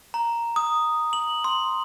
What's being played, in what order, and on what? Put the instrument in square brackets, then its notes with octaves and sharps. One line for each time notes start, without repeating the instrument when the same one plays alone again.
[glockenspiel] A#5
D#6
F#7
C6